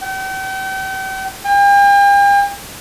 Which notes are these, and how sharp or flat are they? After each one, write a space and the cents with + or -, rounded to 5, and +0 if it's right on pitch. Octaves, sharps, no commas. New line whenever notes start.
G5 -40
G5 +45